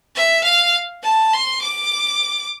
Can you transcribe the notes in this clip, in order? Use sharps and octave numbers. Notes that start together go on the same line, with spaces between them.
E5
F5
A5
C6
D6